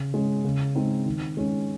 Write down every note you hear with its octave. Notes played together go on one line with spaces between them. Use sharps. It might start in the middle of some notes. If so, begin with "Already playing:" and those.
Already playing: C#3
G#3 C#4
C#3
G#3 C4 D#4
D#3
G#3 C#4